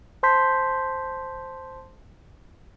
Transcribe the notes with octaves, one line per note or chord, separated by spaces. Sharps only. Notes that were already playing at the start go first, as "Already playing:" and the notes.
C5 A5 C6 G6 B6